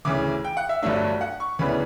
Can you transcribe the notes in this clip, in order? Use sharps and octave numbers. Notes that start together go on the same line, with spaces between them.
D2 C#3 E3 D6
G5
F#5
E5
G1 G2 F#3 A3 D4 E5
F#5
C#6
D2 C#3 E3 B3 D4 B5